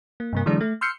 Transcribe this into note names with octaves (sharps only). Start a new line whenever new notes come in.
A#3
G2 C3 A#3
D3 E3 F#3 G#3 D4
A3
C6 E6 F6 G6 C7 C#7